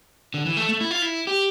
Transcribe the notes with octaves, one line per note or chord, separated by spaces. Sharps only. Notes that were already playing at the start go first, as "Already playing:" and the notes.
D3
E3
A3
A3
E4
F4
E4
G4